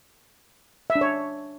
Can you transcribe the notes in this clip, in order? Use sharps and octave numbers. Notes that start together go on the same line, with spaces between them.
E5
D4
C#5